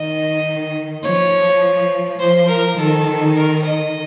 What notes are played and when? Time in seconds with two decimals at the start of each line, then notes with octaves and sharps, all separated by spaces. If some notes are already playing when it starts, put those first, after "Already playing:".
Already playing: D#3 D#5
1.04 F3 C#5
2.19 F3 C5
2.48 A#4
2.77 D#3 A4
3.36 A#4
3.65 D#5